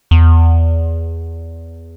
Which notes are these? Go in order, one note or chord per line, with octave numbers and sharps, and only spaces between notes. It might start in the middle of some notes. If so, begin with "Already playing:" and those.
E2